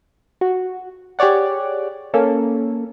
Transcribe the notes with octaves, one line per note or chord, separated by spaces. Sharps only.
F#4
G4 G#4 C#5 D5 F#5
A#3 C#4 A4